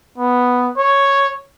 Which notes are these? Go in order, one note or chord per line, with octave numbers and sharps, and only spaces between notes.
B3
C#5